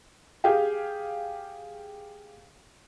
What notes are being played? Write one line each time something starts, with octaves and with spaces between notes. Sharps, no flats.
G4 G#4 F5 G5